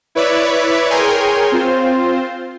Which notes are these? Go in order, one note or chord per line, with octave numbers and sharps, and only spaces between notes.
E4 B4 C#5 D5 E5
G#4 A#4 C#5 G5 G#5 C6
C4 F4 C5